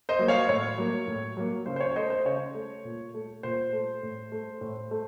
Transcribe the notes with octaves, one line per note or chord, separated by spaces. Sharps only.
C5 D#5
F#3 A#3
C#5 F5
A2 C#5
F#3 A#3
A2
F#3 A#3
C#3 C5
C5
C#5
A3 C5 D#5
C5
C#3 C#5
A3
A#2
A3
A#2 C5
A3
A2
A3
A2
A3